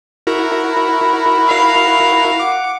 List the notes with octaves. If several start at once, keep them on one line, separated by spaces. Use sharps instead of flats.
E4 F#4 A#4
B5
F5
F#5 D6